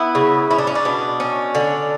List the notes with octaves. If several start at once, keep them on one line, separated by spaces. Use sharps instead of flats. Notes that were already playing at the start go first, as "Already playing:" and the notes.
Already playing: B3 E4
C#3
C#4 E4
D4
C#4
D4
B2
C#4
D3